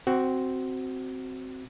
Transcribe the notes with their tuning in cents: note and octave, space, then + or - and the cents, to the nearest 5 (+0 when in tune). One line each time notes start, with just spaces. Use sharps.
C4 +0 F#4 +10